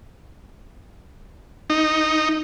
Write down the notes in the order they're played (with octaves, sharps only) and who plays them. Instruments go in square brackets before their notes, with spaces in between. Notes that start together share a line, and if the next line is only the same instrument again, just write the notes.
[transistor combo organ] D#4